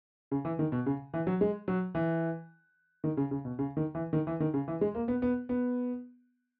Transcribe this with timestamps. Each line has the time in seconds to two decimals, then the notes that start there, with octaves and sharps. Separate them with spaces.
0.31 C#3
0.45 E3
0.59 D#3
0.72 B2
0.86 C#3
1.14 E3
1.27 F#3
1.41 G#3
1.68 F#3
1.95 E3
3.04 D#3
3.17 C#3
3.31 C#3
3.45 B2
3.59 C#3
3.77 D#3
3.95 E3
4.13 D#3
4.27 E3
4.40 D#3
4.54 C#3
4.68 E3
4.81 G#3
4.95 A#3
5.08 B3
5.22 B3
5.49 B3